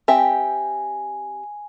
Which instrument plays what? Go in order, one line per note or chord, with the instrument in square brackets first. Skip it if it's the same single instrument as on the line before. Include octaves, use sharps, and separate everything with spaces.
[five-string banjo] C4 G4 E5 [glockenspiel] G#5